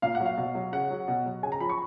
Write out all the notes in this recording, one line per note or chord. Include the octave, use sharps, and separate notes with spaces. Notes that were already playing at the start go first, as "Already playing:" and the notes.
A#2 F5
F#5
F#3
F5
B2
F#3
C#3 F#5
F#3
B2
F#3
C#3 G#5
A#5
F3 B5
C#6